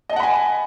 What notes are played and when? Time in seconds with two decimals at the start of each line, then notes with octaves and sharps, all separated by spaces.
0.09 D#5
0.13 A5
0.16 F#5
0.20 B5
0.23 G#5